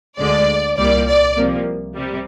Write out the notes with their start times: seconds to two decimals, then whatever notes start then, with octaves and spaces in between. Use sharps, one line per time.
0.18 D2 D3 G#3 D5
0.77 C2 A#2 G3 A#3 D5
1.08 D5
1.36 C2 C3 F3 A#3
1.95 C3 G3